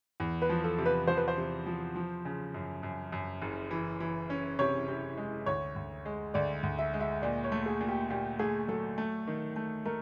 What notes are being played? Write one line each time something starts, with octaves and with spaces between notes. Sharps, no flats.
E2
B4
F3
A4
C3
B4
F3 C5
B4
C5
C3
F3
F3
C#3
F#2
F#2
F#2
F#1
E3
E3
C#4
C3 C#5
C3
G#3
D2 C#5
D2
G#3
D2 D5
D2
E5
G#3
E5
A#2 D5
C#5
A3
G#4
A#2
G4
A#2 G4
A3 G#4
F#3 A4
A3
D#3
A3
A3 A#4